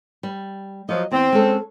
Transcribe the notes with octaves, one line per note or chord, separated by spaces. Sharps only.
G3
F3 F#3 D#5
E2 C4
G#3 C#4 A4